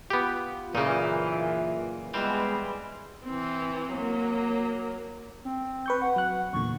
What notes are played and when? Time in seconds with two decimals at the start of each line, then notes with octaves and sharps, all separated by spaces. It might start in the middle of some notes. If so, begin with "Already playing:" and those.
0.10 B3 F4 G4
0.75 F#2 A#2 C#3 E3 A#3 D#4
2.14 E3 G3 G#3 B3 C4
3.25 E3 C4
3.93 F#3 A#3
5.45 C4
5.86 B4 C#6 G6
6.02 F#5 C#6
6.16 F#3 F#6
6.53 E2 A#2 D3 C#6